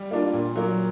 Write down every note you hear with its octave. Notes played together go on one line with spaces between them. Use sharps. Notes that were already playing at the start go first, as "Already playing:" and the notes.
Already playing: G3
A#3 D4 F4
A#2
F#3 A#3